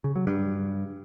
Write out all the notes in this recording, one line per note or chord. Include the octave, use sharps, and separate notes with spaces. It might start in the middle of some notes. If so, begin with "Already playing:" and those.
C#3
F#3
G2